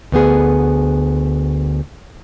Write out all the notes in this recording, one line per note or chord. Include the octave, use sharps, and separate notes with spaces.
D2 B3 G#4